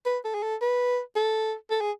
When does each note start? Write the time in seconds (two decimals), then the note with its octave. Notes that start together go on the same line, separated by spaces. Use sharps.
0.05 B4
0.25 A4
0.34 G#4
0.43 A4
0.61 B4
1.16 A4
1.70 A4
1.81 G#4